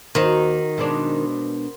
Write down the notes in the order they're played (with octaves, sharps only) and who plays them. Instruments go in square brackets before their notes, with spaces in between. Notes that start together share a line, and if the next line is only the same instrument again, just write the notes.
[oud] D#2 D#4 C5 [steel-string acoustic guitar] D#3 [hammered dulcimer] F#4
[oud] B2 G#3 D4 [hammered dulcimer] A#4 C5